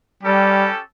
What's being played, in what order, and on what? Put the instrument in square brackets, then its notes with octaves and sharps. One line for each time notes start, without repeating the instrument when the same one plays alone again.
[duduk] G3 [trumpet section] C#4 G4 A4